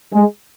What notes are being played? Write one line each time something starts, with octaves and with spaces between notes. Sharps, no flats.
G#3